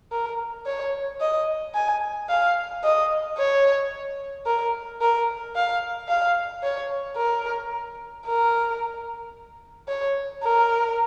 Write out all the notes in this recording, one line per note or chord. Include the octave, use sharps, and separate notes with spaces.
A#4
C#5
D#5
G#5
F5
D#5
C#5
A#4
A#4
F5
F5
C#5
A#4
A#4
C#5
A#4